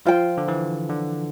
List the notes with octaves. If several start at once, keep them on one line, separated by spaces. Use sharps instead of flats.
F3 F4 C5 G5
D3
E3
D3